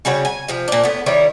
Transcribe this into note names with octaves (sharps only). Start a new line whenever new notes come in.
C#3 G3 F#4 C#5
G#5
C3 F3
A#2 D4
A2 B3
D#3 G3 E4 C#5